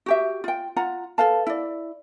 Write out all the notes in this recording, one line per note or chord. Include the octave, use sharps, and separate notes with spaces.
F#4 G4 E5
F4 G5
F4 F#5 A#5
A4 B4 F5 A5
E4 D5